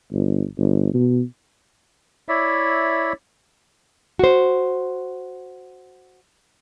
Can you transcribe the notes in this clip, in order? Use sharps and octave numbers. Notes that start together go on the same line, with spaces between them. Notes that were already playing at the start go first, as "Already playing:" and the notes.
G1
G1
B2
E4 C#5 D5 E5
F#4 C5